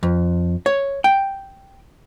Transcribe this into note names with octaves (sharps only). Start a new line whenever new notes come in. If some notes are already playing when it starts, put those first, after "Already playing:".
F2
C#5
G5